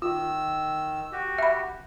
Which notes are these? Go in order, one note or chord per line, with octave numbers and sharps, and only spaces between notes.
D#3 F4 E6
F#4 G4
E5 B5